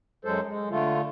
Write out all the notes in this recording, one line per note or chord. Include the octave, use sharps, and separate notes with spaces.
F#2 F#3 G#3 A4 C5
G#3
D3 A3 F4